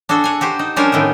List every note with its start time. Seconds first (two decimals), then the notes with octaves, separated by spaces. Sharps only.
0.09 D4 F#4 G#4 A4
0.24 F#5 G#5
0.41 F#4 G4 C5
0.59 D#4
0.76 F3 G3 C#4 D4 A#4 C5
0.92 A2 D#3 A3 B3